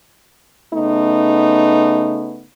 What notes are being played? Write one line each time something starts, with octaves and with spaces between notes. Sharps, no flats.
C#3 A3 B3 D#4